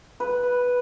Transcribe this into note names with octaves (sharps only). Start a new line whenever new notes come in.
B4